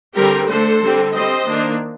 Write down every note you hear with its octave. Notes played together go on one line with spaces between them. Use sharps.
D3 G3 C4 G4 A#4
D3 A3 D4 A4 C5
D3 G3 C4
G3 C4 C5 D#5
D#3 A#3 D4